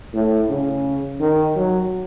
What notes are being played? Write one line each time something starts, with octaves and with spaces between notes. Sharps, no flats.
A2
C#3
D#3
F#3